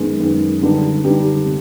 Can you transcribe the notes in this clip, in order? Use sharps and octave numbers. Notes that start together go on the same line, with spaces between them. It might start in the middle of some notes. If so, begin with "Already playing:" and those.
Already playing: F#2 D#3 G#3 B3
F#2 D#3 G#3 B3
D3 G3 B3 D#4 G4
D3 G3 B3 D#4 G4
C3